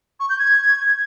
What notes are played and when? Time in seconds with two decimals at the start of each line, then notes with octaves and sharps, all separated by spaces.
0.20 C#6
0.30 G6
0.39 G#6